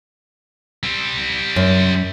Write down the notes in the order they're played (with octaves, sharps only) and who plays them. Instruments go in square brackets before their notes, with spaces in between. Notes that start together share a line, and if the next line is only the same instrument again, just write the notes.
[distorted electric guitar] G3 C4
[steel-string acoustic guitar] F#2